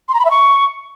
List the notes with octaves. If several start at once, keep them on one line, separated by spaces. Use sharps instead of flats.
C6
A#5
B5
E5
C#6